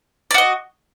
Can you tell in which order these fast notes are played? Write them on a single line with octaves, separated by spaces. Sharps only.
D5 F#4 D#5